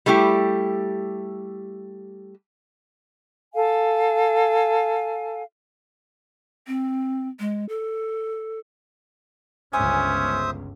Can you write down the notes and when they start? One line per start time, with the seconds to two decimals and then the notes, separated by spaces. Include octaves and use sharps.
0.06 G3 A3 E4 G4
3.53 A4 F5 G#5
6.67 C4
7.40 G#3
7.69 A4
9.73 G1 C#2 C#4 C5 E5 G#5 D#6